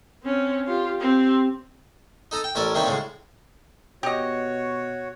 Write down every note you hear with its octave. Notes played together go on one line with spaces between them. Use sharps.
C4 C#4
F4 G4
C4 G4
D#4 A4 A#5 D#6
G5
A1 C#4 A4 A#4 D5
C3 D#3 G3 A#3 D#4 C#5
A2 C#3 G#3
B2 F#4 G4 C#5 D#5